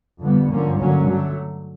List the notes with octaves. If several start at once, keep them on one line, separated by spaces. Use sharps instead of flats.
F2 D3 G3 B3
G2 D3 F3 A#3 C#4
D3 F#3 A#3 C#4
D3 F#3 A3